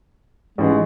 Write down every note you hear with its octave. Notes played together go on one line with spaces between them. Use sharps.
A1 E3 G#3